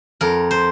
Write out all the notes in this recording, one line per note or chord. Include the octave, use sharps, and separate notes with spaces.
F2 A#4
C5